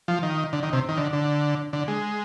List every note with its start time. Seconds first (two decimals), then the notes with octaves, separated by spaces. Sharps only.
0.08 F3
0.23 D#3
0.53 D3
0.63 D#3
0.73 C3
0.89 D#3
0.97 D3
1.13 D3
1.73 D3
1.88 G#3